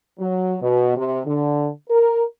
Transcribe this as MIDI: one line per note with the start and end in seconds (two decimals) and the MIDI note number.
0.20 0.57 54
0.62 0.96 47
0.97 1.19 48
1.26 1.69 50
1.89 2.22 70